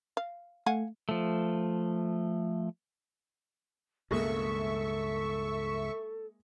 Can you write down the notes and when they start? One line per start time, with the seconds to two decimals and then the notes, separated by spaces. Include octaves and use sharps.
0.17 F5
0.66 A3 F5 F#5 G#5
1.09 F3 A3
4.11 C#2 G2 B2 G#3 A#3 A4 E5 C#6